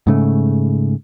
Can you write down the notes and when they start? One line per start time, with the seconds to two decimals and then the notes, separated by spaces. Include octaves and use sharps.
0.07 G#2 C#3 A3